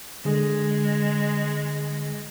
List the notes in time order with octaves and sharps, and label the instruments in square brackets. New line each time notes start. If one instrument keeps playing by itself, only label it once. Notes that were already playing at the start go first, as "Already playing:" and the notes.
[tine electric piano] D3 G#4 [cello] G#3